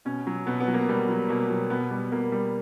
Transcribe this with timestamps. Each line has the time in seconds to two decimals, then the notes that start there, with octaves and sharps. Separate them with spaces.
0.05 B2 C#4
0.27 F#3
0.47 B2 B3
0.60 B3
0.68 F#3
0.74 A#3
0.88 B2 G3
1.09 F#3
1.29 B2 A#3
1.50 F#3
1.70 B2 B3
1.91 G3
2.12 B2 A#3
2.32 G3